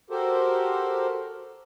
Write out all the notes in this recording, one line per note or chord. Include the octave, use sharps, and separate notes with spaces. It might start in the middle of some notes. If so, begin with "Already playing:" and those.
F#4 G4 A4 A#4 C5